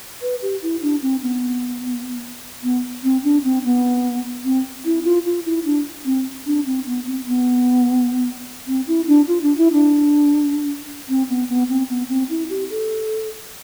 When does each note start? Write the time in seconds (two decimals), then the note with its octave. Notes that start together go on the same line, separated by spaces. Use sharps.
0.22 B4
0.42 G4
0.62 E4
0.82 D4
1.02 C4
1.22 B3
2.63 B3
3.04 C4
3.24 D4
3.44 C4
3.64 B3
4.44 C4
4.85 E4
5.05 F4
5.26 F4
5.46 E4
5.65 D4
6.05 C4
6.46 D4
6.66 C4
6.86 B3
7.06 C4
7.26 B3
8.67 C4
8.87 E4
9.07 D4
9.28 F4
9.43 D4
9.57 E4
9.73 D4
11.09 C4
11.29 B3
11.49 B3
11.69 C4
11.89 B3
12.09 C4
12.30 E4
12.50 G4
12.70 A4